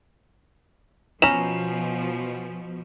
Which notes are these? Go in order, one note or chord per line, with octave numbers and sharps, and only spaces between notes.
B2 F3 C#4 A#5 B5 E7